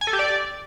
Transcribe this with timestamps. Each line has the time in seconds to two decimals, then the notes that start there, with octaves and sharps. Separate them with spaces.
0.01 G#5
0.07 A4
0.13 G4
0.19 D5